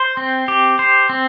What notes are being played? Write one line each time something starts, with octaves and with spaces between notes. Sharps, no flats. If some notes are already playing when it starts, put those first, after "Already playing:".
Already playing: C5
C4
G4
C5
C4